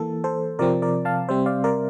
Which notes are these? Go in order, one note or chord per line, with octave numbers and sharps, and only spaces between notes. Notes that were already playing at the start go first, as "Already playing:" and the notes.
Already playing: E3 A#3 A4
A4 C5
C3 F3 C4 A#4 D5
A#4 D5
F5 A5
C3 G3 C4 C5 E5
D5 F5
A#4 D5